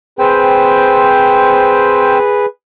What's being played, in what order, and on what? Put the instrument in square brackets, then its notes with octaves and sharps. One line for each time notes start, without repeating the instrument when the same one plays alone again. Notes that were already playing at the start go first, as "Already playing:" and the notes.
[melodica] C4 C5 G5 [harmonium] G#4 B4